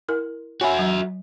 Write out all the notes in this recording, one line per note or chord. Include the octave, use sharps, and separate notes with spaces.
E4 A#4
F#4 C#5 E5 G#5 B5
F#3